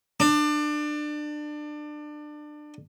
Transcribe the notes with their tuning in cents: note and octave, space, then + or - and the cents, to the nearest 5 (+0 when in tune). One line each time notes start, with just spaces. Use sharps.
D4 +25